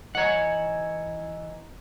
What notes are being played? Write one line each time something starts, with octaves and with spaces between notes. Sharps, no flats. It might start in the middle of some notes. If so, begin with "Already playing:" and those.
E3 C#5 D#5 F#5 G#5 A#5